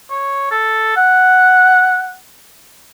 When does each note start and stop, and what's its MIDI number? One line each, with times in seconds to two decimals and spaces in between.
0.10 0.49 73
0.51 0.93 69
0.97 2.14 78